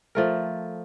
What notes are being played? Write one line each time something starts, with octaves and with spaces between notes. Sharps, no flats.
F3 A3 A#4